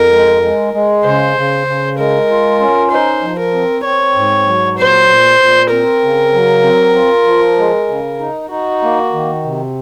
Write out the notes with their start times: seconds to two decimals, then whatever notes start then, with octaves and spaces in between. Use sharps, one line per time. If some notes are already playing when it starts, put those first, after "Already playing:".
Already playing: F2 A#4
0.13 G#3
0.43 G#3
0.73 G#3
1.05 C#3 C5
1.37 C#3
1.67 C#3
1.98 G#3 A#4
2.29 F4
2.60 C#4
2.91 D#4 C5
3.22 F3
3.39 A#4
3.54 C4
3.84 C4 C#5
4.15 G#2
4.47 F#3
4.78 A#2 C5
5.08 A#2
5.39 A#2
5.71 C4 A#4
6.02 C#3
6.34 F#3
6.64 C4
6.95 F4
7.26 F3
7.58 G#3
7.88 C#3
8.20 D#4
8.50 D#4 F#4
8.82 A#3
9.13 D#3
9.45 C3